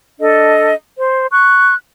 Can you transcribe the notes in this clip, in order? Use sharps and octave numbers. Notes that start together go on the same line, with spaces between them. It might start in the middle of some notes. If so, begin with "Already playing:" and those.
D4 A4 D#5
C5
C#6 F#6